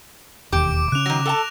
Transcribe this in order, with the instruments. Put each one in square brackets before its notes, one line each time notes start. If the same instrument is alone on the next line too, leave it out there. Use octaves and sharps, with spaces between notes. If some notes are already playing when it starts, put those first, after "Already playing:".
[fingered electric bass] E1 D#2 [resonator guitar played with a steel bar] G4 [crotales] D6 D7
[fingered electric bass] C#3 C#4 [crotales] F#6 F7
[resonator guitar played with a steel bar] D#3 F#3 [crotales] A#6
[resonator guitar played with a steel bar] A4 G5 A5